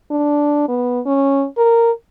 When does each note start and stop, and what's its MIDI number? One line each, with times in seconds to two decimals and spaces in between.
0.11 0.65 62
0.69 1.00 59
1.06 1.46 61
1.57 1.92 70